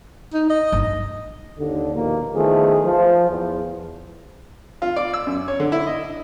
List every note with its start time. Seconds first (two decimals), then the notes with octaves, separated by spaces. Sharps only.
0.34 D#4
0.50 D#5
0.72 G1
1.59 D#2 D3
1.94 A#1 D#2 B2 A#3
2.34 E2 D#3 F3 A3 G#4
2.86 F3
3.30 E2
4.82 F4
4.96 D5
5.13 E6
5.27 F#2
5.48 C#5
5.60 D3
5.72 E4
5.87 D#5